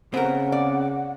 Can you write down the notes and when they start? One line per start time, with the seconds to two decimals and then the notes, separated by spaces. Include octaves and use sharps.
0.14 C#3 B3 C4 A#4 F#5
0.52 D5